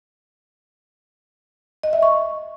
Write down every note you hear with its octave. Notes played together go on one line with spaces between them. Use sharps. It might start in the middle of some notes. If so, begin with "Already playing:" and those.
D#5
E5
C#6